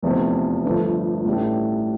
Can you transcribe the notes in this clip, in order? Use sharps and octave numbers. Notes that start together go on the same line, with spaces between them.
F1 E2 C3 F3
G1 G2 F3 A3 D4
A1 A2 E3 G3 D4